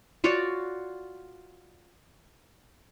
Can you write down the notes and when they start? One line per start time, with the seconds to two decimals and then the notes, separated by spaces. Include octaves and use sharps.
0.24 F4 F#4 C#5 D5